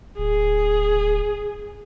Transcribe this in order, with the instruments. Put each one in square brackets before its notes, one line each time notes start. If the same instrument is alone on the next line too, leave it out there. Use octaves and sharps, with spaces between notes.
[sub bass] D1 [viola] G#4